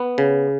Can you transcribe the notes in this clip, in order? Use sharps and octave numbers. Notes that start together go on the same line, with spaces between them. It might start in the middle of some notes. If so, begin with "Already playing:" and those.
Already playing: B3
C#3